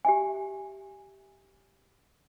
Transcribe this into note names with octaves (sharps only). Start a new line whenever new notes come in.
G4 E5 G#5